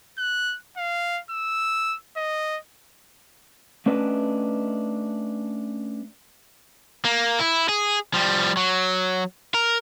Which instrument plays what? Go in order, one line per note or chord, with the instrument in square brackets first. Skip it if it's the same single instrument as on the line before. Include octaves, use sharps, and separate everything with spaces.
[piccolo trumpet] F#6
F5
E6
D#5
[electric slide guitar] A3 C#4 D4 B4 D#5
[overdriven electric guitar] A#3
E4
G#4
F3 G3
F#3
A#4